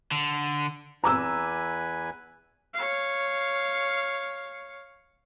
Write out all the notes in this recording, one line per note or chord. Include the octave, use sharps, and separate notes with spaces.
D3
E2 B4 G#5 A#5 D6 E6
C#5 F5